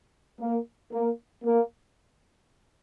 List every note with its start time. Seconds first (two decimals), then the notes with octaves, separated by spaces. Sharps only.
0.40 A#3
0.92 A#3
1.44 A#3